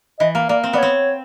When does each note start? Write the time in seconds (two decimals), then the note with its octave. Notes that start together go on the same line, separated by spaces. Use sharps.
0.20 E3 D#5
0.35 A#3
0.49 A#3 D5
0.64 C4
0.73 B3 D5
0.78 C4 C#5